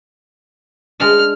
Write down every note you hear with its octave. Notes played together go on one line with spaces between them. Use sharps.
G#3 D4 F6